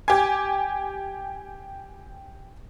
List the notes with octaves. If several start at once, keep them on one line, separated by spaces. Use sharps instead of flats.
G4 G#5